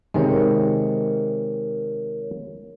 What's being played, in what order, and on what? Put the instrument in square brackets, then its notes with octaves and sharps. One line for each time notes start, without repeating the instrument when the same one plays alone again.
[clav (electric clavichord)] C3 D#3 G#3 [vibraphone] A#4 C#5